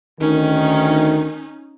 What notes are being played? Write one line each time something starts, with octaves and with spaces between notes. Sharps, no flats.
D2 D#3 C#4 D#4